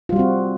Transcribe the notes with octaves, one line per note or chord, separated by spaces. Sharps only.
G3 C4 F4 F#4